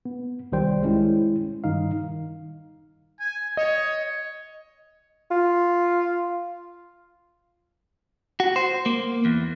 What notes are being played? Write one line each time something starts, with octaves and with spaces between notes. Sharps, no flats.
B3
C2 D#3 G3 C5 G5
G#3 C#4 E4
G2 D#3 G3 D#4 F5
G#5
C#5 D#5
F4
F#4
C5
A#3
E2